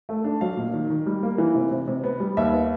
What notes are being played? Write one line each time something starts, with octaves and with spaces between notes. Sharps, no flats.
A3
D4
F#3 F5
A#2
D#3
D#3
G3
A#3
E3
C3
C3
C3
B3
G3
D#2 E5
B3